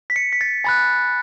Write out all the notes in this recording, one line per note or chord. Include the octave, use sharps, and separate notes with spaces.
B6
C#7
B6
A6
G#5 B5 F#6 A6